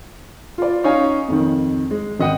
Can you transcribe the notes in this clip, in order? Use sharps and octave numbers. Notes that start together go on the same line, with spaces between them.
F4 D5
C#4 D#4 C#5 F5 G#5
F2 D#3
G#3
G#1 D#5 F#5 G5 D#7